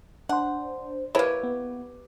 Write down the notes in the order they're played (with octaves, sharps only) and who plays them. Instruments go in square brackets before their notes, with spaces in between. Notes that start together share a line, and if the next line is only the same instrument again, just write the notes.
[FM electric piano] D4 C5 [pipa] F#5
[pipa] A#3 E4 [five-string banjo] G4 B4 C#5
[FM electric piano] B3